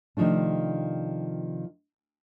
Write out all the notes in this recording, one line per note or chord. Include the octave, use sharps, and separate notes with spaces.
C3 D#3 F3 A3 D4